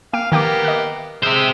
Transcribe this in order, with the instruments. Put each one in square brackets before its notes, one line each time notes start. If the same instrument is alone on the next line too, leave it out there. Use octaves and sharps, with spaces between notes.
[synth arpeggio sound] A#3 G5 D7 [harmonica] F5
[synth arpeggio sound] D#3 G5 D6 [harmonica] A#3 B3 G4
[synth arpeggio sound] D#5 F#6
[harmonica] G#3 E5 [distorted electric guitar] G4 C5